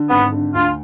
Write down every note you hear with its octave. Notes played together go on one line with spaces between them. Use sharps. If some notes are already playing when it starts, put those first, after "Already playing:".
Already playing: D3
G#1 B3
D3
D2 F4